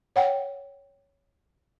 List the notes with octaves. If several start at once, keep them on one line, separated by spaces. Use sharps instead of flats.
C#5 F#5 G5